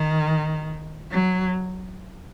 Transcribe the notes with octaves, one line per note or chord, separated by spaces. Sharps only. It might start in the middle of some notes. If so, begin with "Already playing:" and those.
Already playing: D#3
F#3